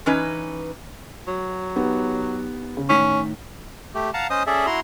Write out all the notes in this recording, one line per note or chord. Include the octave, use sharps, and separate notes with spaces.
E3 C#4 D#4 B4
F#3
B3 D#4 G4
C#3
A2 D#3 C#4 B6
A3 G4
F5 F#5 A5 A#5
C#4 C5 D#5 D#6
C#4 G#4 A4 D5 E5
E4 F#4 A#5 C6